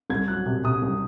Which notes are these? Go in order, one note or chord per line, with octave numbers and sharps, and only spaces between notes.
C2 G#6
F#3 F#6
C3
C3 D#6
C2